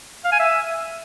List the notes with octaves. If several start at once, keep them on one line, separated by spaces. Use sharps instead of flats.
F5
G#5
E5